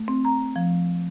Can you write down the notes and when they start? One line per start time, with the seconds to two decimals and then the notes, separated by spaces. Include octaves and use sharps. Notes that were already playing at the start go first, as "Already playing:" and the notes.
Already playing: A3
0.08 C4
0.25 A#5
0.56 F3